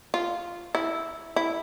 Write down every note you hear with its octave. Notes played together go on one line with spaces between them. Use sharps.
F4
E4
E4